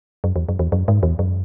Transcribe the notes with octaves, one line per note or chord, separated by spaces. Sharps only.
F#2
E2
F#2
E2
F#2
G#2
E2
F#2